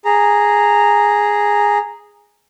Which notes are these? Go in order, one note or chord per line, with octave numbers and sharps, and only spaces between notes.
G#4 A#5